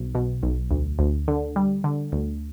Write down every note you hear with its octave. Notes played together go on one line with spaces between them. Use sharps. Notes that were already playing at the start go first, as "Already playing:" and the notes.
Already playing: B1
B2
B1
D2
D2
D3
G3
D3
D2